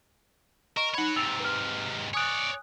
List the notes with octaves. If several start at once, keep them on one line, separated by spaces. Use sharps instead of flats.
A#4 D#5 C#6 E7
D#4 C#5 F#5 B5
G#2 C3 E6 A6 F7
B4 F6
C#5 D5 G#5 D#6 F#6